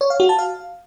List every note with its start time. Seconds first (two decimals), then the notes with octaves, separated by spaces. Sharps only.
0.01 C#5
0.10 F5
0.20 F#4
0.29 A5
0.39 F5